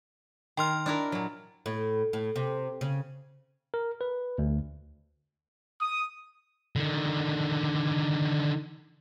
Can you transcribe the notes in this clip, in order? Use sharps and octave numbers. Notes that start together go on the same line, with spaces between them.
D#3 G5 C6 F6
D4 E4 A#4
A#2 F#3
A2
A2
C3
C#3
A#4
B4
D2
D#6
D3 D#3